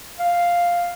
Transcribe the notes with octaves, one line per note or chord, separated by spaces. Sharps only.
F5